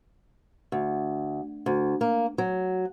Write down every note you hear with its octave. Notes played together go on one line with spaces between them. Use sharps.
D2
D2
A#3
F#3